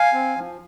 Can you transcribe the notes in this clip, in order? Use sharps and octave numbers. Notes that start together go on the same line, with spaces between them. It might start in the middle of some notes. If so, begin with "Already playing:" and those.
Already playing: F5 G#5
C4
F3